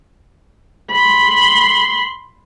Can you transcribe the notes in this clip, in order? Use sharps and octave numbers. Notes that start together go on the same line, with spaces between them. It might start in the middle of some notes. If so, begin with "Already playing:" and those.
B5 C6